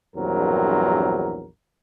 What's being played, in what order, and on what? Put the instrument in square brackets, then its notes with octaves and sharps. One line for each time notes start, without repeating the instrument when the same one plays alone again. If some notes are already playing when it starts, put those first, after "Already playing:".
[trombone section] A#1 E2 G2 F#3 C4 A#4